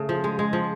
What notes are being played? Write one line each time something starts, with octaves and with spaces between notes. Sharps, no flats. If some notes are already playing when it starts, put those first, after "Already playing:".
Already playing: C#3 A3
F3
G#3
G#3
F3